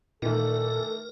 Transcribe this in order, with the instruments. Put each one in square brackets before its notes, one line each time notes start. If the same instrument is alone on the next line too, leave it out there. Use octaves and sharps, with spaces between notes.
[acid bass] A#2 [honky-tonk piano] D#3 E3 A3 [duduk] A4 [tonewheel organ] A#4